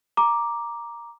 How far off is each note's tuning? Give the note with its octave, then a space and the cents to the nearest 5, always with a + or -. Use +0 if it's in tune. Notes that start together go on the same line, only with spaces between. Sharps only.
A#5 +10 D6 +0